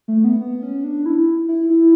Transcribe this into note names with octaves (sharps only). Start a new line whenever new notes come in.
A3
B3
B3
C#4
D4
E4
E4
E4